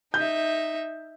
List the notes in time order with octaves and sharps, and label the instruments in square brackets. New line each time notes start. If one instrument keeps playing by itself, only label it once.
[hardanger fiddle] D#4 E5 [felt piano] G6